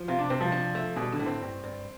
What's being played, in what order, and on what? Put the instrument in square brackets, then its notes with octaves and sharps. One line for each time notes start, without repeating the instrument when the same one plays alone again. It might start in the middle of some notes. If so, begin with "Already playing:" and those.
Already playing: [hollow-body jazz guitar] F3
[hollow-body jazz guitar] C3 [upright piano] F4
[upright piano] D4
[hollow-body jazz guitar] C3 [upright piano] C4
[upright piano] F3
[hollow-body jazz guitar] D4
A3
[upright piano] B2 [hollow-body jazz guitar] G3
[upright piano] D3
[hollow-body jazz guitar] A2
[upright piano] C4
[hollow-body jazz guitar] G2
G2